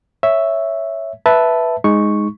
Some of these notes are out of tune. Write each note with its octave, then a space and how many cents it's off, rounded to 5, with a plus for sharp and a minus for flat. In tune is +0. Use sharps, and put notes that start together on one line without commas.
C#5 +0 E5 +0
B4 +0 E5 +0 A5 +0
G#3 +0 D#4 +0 C#6 +0